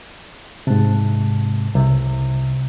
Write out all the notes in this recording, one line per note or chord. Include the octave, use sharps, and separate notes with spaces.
G#2 C3 A5 F#6
C2 C3